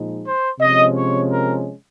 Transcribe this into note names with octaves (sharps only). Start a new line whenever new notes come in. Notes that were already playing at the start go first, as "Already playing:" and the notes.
Already playing: A#2 F3 G#3 D#4
C5
C3 F3 G#3 C#4 D#5
C#5
A#4